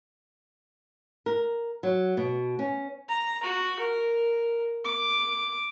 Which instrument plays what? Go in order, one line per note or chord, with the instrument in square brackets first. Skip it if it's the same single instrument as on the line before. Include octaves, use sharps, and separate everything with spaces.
[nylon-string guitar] A#4
F#3
B2
C#4
[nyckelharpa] A#5
F#4
A#4
D6